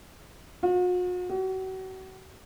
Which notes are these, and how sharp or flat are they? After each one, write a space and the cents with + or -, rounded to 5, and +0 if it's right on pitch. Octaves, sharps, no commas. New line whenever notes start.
F#4 -45
F#4 +35